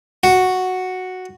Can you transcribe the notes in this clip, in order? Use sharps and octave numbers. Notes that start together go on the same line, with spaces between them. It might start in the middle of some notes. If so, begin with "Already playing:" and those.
F#4